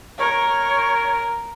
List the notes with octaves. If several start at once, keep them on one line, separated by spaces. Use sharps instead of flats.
A#4 C#5